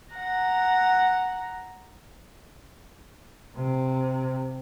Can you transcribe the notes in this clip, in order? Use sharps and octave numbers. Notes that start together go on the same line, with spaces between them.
F#5 A#5
C3